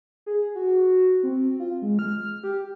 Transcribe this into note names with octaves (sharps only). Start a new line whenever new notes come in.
G#4
F#4
C4
F4
G#3
F6
G4